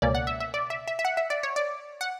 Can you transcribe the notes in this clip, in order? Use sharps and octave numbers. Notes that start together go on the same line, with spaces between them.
C#2 B2 A#3 C#4 D5
F#5
E5
E5
D5
E5
E5
E5
F#5
E5
D5
C#5
D5
F#5